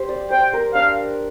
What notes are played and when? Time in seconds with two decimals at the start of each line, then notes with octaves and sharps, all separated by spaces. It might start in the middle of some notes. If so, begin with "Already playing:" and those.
Already playing: G4 C5
0.09 D5
0.30 C5 G5
0.53 A#4
0.74 D4 F5